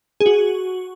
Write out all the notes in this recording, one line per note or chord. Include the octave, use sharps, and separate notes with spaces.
G#4
F#4